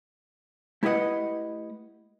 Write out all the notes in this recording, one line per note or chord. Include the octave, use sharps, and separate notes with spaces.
A3 E4 G4 B4 D#5 F#5